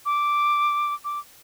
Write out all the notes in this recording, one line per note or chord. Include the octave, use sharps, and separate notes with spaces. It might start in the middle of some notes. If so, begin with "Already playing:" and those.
D6
D6